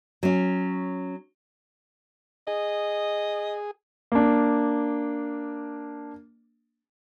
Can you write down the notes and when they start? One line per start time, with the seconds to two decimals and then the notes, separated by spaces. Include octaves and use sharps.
0.23 F#3 C#4
2.47 G#4 D#5
4.12 A#3 D4